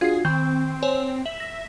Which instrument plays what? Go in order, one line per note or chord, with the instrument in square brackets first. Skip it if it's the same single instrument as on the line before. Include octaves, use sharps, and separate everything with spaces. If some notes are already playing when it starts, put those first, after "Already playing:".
[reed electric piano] D4 F4 F#4 [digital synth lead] G#4 [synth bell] G#6 C7
[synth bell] D#3 [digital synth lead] C4 [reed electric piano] G6
[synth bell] C5 C#5 G#5
[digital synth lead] E5 [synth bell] F#7
[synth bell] A#6